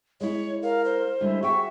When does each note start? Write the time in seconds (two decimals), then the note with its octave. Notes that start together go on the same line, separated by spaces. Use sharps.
0.21 G#3 E4 C#5
0.62 A#4 F5
0.85 C5
1.21 D3 G3 G#3 E4
1.43 F#4 G#4 E5 G5 C#6